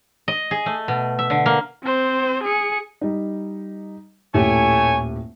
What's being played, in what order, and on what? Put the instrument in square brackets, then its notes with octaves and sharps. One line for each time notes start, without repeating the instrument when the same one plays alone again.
[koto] D#5
G#4
A3
B2
E5
D3
A#3
[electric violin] C4 C5
G#4 C#7
[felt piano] G3 D#4
[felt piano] D#1 A2 G4 [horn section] A3 C#5 G#5